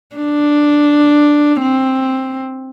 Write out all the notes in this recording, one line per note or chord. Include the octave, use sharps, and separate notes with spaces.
D4
C4